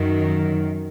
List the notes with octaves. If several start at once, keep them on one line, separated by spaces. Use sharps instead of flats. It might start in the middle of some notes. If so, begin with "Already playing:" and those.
Already playing: F#2 D#3 F#3